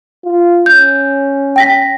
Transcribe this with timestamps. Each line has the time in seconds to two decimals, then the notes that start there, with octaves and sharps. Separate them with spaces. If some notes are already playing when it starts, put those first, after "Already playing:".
0.24 F4
0.66 C#4 G6
1.56 G5 A#6 B6